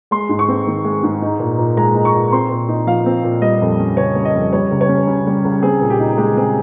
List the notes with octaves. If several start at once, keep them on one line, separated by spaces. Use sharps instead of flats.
G#3 C6
G#2
C#6
C4
D#3
G#3
G#2
D#4
A#2
A#2
G#3 A#5
D#4
C#6
A#2
C4 C6
A#2
D#4
F3 F5
C4
A#2
G3 D#5
F2
C#4
C#3 C#5
G3
D#5
F2
G3 C#5
C#2
C#5
C#4
C#3
G3
C#2
C4 G#4
A#2
G4
D#4
G#3 G4
C4 G#4